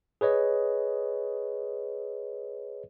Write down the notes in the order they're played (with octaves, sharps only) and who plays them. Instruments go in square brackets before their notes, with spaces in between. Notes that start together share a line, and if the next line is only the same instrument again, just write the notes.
[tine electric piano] G#4 B4 C#5 D#5